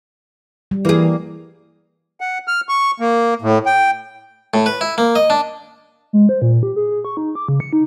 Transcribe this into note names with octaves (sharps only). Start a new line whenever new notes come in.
G3
E3 A#3 G#4
F#5
F6
C#6
A#3
A2
G5
A2
B4
E4
A#3
D#5
D4
G#3
C5
A#2
G4
G#4
G#4
C#6
D#4
D6
C#3
C#7
D#4